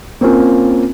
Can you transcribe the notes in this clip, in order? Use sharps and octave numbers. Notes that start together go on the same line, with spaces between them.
A#3 C4 C#4 F4 A#4